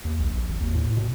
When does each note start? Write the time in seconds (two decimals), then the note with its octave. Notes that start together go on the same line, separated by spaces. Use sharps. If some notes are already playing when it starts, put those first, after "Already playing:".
0.05 D#2
0.19 A#1
0.34 A#1
0.49 G#1
0.60 D#2
0.75 A2
0.96 B2